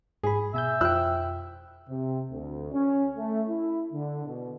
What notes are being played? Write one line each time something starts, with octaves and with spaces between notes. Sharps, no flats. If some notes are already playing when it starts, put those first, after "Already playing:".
G#2 G#4 B5
B2 E5 G#5 G6
F2 F3 G5 E6 F#6
C3
D2
C#4
A3
E4
D3
B2